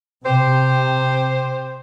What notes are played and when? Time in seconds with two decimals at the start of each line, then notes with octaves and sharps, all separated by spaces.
0.25 C3 G4 C5